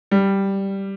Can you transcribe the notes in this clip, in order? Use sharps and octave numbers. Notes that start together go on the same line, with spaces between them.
G3